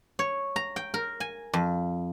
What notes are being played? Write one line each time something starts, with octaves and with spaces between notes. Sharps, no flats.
C#5
A#5
G5
A#4
G#5
F2